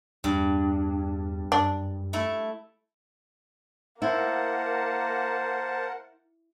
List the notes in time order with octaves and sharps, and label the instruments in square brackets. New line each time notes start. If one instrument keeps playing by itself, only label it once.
[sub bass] E2 [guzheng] G2
[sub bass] F#2 [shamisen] D4
[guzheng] A3 E4
[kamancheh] A#3 [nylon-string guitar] E4 [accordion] A#4 F#5 [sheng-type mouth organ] C5 A5